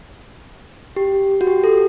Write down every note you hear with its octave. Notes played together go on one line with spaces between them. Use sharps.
G4
F#4
G4
A4